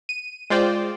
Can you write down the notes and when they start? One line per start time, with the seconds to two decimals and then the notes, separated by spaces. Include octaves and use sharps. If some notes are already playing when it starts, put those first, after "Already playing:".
0.09 D#7
0.50 G#3 F4 C5 D5 G5